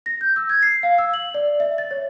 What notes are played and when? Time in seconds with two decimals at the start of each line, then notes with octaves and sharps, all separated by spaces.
0.06 A#6
0.21 G6
0.36 E6
0.50 G#6
0.63 C7
0.83 F5
0.98 E6
1.14 F#7
1.34 D5
1.60 E5
1.78 A6
1.91 C#5